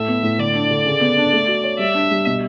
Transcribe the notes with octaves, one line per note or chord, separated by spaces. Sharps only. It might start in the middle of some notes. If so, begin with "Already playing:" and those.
Already playing: A2 A4 E5
B3
A2
D3 D5
D4
D3
C#3
B3
D4
A3
F#4
C#5
G3 E5
D4
G3
B2